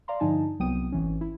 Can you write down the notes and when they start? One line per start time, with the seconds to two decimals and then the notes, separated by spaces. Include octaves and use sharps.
0.08 D5 F5 A#5 C6
0.20 G2 D3 F3 D#4 G#5 A5
0.60 C2 F#3 B3 G5 D#6 D#7
0.92 G#1 E3 C#4
1.21 E4